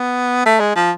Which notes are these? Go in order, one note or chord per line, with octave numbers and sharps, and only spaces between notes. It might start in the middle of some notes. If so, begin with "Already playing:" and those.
Already playing: B3
A3
G#3
F3